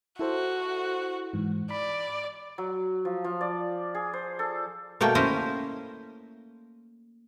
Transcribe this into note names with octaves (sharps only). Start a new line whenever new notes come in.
E4 F#4 A4 C5
G#2 E3
D5 B5
F#3
F3
F3
D5
G#4
C5
A4
B2 A3 A#3 G5
C#4 E4 C5 D#5